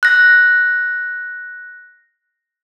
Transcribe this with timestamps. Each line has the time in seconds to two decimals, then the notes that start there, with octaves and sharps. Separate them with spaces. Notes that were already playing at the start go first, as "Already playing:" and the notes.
0.03 F#6 A#6